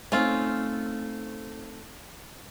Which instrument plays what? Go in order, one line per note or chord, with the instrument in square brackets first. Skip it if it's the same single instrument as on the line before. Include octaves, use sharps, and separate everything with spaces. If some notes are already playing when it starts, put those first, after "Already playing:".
[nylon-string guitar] A3 C4 D#4 [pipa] C#4 F4